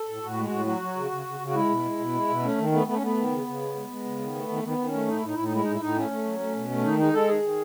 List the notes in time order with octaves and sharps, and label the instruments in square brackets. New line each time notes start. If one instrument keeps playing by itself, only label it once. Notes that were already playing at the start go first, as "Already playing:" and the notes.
Already playing: [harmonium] A4
A2
A2 F#4
G#3
F#4
A2
F#3 F#4
F#3
C#3
C#3
C#3
C#3
F#4
G#3 E4
B2
G#3
B2
G#3
B2
A3 C#4
D#3
A3 B3
A3 B3
C#4
A3 B3
D#3
C#3
C#3
G#3
G#3
G#3
C#3
D#3
A3
D#3
D#3 B3
D#3
C#4
A3
A2 D#4
E4
A2 D#4
A2 E4
D#4
G#3 E4
A2 D#4
E4
A2 D#4
A3 C#4
A3
F#3
A3
B2
A3
D#3 D#4
G#3 D#4
G#3 A4
D#3 G#4
D#3